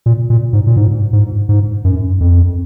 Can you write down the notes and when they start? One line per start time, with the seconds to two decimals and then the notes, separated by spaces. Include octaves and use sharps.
0.06 A#2
0.30 A#2
0.53 G#2
0.67 A#2
0.76 G#2
1.13 G#2
1.49 G#2
1.84 F#2
2.21 F2